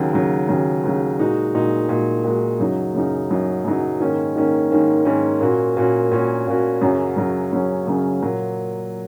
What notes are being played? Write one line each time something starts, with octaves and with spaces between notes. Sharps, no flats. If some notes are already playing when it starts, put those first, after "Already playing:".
Already playing: D#2 C#3 F#3
D#2 C#3 F#3
D#2 C#3 F#3
D#2 C#3 F#3
A#2 G#3 D#4 F#4
A#2 G#3 D#4 F#4
A#2 G#3 D#4 F#4
A#2 G#3 D#4 F#4
F#2 C#3 F#3 D#4
F#2 C#3 F#3 D#4
F#2 C#3 F#3 D#4
F#2 C#3 F#3 D#4
G#2 D#3 A#3 C#4
G#2 D#3 A#3 C#4
G#2 D#3 A#3 C#4
G#2 D#3 A#3 C#4
A#2 A#3 C#4 F#4
A#2 A#3 C#4 F#4
A#2 A#3 C#4 F#4
A#2 A#3 C#4 F#4
F#2 C#3 F#3 C#4
F#2 C#3 F#3 C#4
F#2 C#3 F#3 C#4
F#2 C#3 F#3 C#4
A#2 F#3 A#3